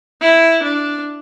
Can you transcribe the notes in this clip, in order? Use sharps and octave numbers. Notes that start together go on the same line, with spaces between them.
E4
D4